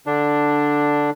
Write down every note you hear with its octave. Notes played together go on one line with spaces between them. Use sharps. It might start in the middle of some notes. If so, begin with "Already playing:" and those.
D3 D4